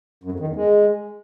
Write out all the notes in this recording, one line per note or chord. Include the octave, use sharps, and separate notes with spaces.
F#2
F2
D#3
E2
G#3